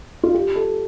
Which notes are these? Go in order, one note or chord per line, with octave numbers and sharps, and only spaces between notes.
F4
G4
A4